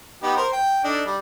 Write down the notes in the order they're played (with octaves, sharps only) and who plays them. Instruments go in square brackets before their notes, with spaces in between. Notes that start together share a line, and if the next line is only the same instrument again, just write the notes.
[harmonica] B3 D#4 G4
A#4 C5
G5
D4 D#4 A4
G3